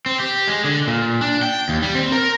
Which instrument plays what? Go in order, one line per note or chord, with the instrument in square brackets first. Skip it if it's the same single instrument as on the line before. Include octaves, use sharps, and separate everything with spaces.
[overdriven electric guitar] C4
G4
G#3
D3
A#2
D4
G5
D#2
G3
C4
A#4